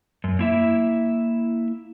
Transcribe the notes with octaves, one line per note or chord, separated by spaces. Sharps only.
F#2
A#3 E4 E5